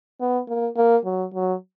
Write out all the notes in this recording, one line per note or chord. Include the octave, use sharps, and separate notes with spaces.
B3
A#3
A#3
F#3
F#3